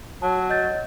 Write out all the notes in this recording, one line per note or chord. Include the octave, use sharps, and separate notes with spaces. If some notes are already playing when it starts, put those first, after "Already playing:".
F#3 A5
D#5 G6 A6